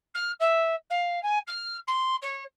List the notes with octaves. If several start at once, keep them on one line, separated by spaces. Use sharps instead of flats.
F6
E5
F5
G#5
F6
C6
C#5